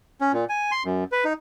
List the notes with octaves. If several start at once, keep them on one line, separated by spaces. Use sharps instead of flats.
C#4
A#2
G#5
C6
F#2
B4
D#4